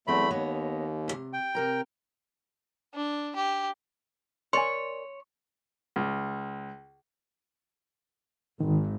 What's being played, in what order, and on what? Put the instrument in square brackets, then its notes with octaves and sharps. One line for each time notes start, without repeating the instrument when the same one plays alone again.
[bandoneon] E2 A3 B5 [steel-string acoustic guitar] F#3 C4 D#5
[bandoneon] D#2 [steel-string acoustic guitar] B3 C#5 D#5
[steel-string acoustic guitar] D2 C3
[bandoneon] G5
[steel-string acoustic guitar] C3 A#4 A#5
[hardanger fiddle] D4
G4
[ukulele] A#4 D5 G#5 [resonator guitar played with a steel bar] C#5 [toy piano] C6
[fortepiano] C#2
[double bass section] G#1 [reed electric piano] D#3